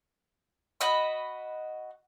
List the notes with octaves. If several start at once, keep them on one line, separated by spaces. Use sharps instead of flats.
F#4 D#5 B5